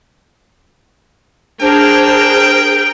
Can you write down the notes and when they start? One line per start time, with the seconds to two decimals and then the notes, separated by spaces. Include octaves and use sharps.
1.61 D4 G#4 A#4 C5 G5